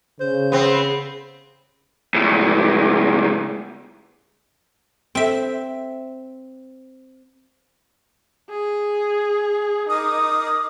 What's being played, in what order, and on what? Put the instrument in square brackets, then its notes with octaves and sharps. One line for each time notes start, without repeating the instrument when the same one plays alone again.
[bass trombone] C#3 [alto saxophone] C5
[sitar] B3 C4 [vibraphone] G#4
[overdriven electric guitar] C#2 A2
[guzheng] C4 E5
[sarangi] G#4
[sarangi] D#4 [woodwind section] A#4 D6 D#6